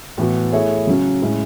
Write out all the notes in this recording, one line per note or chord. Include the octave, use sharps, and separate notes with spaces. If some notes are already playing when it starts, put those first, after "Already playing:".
A2 E3 B3 F#4
A3 E4 G#4 C#5 E5
C#3 F#3 C#4
A2 G#3 C#4 E4